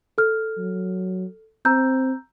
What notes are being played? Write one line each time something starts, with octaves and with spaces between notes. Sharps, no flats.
A4 F6
F#3
C4 A#5 E6 G6